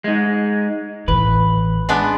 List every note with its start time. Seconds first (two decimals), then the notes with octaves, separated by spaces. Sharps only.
0.04 G#3 D#4
1.08 A1 E3 B4
1.89 G#3 B3 D4